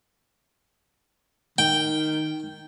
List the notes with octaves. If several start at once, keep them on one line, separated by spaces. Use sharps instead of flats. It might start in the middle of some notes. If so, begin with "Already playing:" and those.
D#3 G5